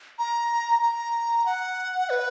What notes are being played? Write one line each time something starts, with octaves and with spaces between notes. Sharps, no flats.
A#5
A#5
F#5
B4